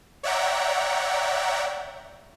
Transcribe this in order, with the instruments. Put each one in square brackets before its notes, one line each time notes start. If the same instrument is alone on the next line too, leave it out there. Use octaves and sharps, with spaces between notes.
[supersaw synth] C#5 D5 E5 F#5 G5 A#5